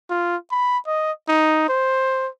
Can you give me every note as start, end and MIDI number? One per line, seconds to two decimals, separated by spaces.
0.10 0.36 65
0.51 0.78 83
0.87 1.12 75
1.28 1.68 63
1.69 2.28 72